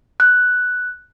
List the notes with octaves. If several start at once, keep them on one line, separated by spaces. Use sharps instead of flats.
F#6